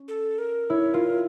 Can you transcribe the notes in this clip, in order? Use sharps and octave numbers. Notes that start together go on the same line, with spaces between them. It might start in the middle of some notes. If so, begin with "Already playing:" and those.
Already playing: C#4
A4
A#4
E4 C#5
F4 A#4